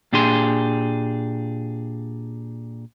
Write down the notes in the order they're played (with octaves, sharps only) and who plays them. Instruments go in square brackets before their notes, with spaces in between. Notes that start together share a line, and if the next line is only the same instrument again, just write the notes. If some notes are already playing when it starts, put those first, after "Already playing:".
[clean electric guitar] A#2 D4 G4 G#4 C6